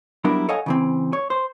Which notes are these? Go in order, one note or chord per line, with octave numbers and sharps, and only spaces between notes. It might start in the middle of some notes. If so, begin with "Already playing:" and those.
F#3 G3 B3 D4 E4 A#4
A4 C#5 D#5 F5 F#5 G#5
C#3 E3 C4
C#5
C5